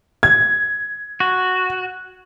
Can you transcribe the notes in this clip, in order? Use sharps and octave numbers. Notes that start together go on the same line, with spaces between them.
G#6
F#4